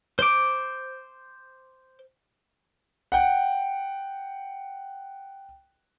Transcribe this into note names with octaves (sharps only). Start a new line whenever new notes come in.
C5 D6
F#5 G5